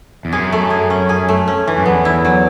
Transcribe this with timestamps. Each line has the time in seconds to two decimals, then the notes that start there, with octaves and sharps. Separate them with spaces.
0.25 E2
0.32 F#2 G#4
0.52 A3
0.70 G#4
0.90 C#4
1.09 G#4
1.29 A3
1.48 C#4
1.67 E3
1.78 F#2
1.86 E2 B3
2.05 E4
2.25 F#3